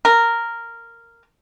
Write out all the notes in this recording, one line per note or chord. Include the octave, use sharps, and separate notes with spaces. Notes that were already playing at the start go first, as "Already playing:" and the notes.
A#4